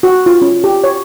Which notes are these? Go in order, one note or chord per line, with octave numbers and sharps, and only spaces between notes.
F#4
F4
C#4
G4
C#5